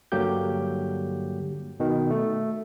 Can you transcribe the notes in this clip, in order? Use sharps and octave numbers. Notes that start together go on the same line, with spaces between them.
G2 D3 F#3 A#3 G4 G6
B2 D#3
A3